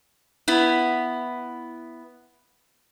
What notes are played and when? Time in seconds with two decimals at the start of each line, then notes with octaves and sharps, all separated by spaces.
0.48 B3 E4